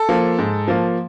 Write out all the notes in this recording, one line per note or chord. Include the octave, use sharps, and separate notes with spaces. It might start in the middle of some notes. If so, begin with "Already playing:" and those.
Already playing: A4
F3 A#3
G#2
F3 A#3